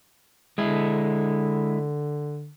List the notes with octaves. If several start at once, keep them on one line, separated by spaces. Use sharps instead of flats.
D3 G#3 E4